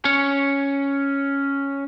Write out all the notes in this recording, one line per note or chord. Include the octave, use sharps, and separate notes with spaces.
C#4 C#5